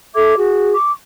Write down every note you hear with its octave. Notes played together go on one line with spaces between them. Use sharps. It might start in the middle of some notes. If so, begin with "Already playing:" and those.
A4 E5 D6 G#6
F#4 G#4
C#6 D6